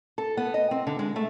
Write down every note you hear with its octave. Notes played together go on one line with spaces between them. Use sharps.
A4
B3
D#5
C4
D3
G#3
A3